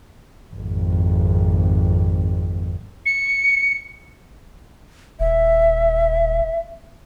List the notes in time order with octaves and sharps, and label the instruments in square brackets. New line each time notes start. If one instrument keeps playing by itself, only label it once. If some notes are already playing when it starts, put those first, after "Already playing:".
[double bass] G#1 F2
[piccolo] C#7
[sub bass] D#1 [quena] E5